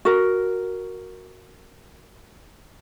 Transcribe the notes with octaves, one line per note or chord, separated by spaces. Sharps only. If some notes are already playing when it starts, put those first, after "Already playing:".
F#4 A#4